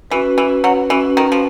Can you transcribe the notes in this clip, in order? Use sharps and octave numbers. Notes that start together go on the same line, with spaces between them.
E3 C#4 F#4 B4
E3
F#3
E3 C#4 F#4 B4
D#3
F3